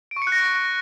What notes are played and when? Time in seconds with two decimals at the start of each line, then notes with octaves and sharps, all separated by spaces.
0.11 D7
0.16 C#6
0.22 C#7
0.27 F#6
0.32 A#6